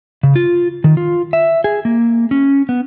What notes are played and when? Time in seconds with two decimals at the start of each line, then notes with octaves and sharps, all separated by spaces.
0.23 C#3
0.36 F4
0.84 D#3
0.97 F4
1.33 E5
1.64 G#4
1.85 A#3
2.31 C#4
2.69 B3